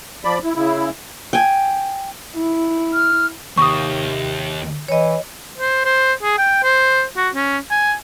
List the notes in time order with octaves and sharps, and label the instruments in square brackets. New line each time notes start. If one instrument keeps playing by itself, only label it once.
[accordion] F3 D5 B5
E4
C#3 E4
[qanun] G5 G#5
[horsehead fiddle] E4
[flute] F6
[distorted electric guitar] D#2 [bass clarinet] C3 [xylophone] C#6 D#6
[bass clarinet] E3 [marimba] C#5 D#5
[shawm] C5
C5
G#4
G5
C5
F#4
C#4
G#5